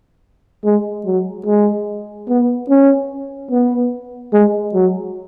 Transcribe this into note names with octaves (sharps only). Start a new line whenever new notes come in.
G#3
F#3
G#3
B3
C#4
B3
G#3
F#3